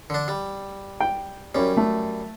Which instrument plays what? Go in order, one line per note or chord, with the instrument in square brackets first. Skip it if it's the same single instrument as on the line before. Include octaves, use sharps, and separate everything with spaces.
[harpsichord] D3 D4
G3
[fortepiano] G5
[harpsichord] F#2 G3 [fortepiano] C#4
[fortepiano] A3